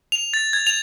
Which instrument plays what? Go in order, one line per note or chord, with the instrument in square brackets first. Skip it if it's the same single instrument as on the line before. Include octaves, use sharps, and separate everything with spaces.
[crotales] F7
A6
G#6
F7